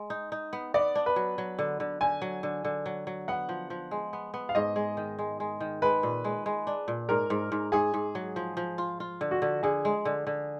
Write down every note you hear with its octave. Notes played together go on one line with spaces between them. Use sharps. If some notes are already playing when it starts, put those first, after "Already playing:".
Already playing: G#3
D#4
D#4
B3
B3 D5
D4
B4
F#3
F#3
D3
D3
D3 G#5
F#3
D3
D3
F#3
F#3
B3 F#5
F3
F3
G#3
B3
B3
F5
G#2 D#5
G#3
D#3
G#3
G#3
D#3
G#3 B4
A#2
G#3
G#3
D4
A#2
G#2 A#4
G#2
G#2
G#2 G#4
G#2
F#3
F3
F3
F4
F4
D3
F#4
D3
D3 G#4
G#3
D3
D3